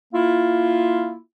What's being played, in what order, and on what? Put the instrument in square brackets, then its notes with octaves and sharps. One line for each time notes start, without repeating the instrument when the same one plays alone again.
[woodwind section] A#3 E4 F4